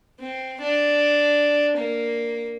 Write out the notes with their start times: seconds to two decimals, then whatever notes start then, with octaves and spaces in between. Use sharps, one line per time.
0.20 C4
0.60 D4
1.77 A#3